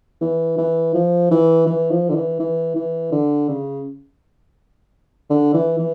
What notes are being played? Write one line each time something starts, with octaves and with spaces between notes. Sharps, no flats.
E3
E3
F3
E3
E3
F3
D3
E3
E3
E3
D3
C#3
D3
E3
E3